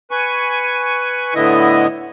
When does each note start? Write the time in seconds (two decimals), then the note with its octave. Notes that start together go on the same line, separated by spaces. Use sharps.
0.11 B4 G#5 C#6
1.35 A2 D3 B3 E4 D#5